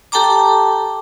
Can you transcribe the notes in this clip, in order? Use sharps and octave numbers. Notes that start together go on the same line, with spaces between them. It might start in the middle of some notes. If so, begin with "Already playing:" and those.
G4 A4 G5 A5 A#5 D6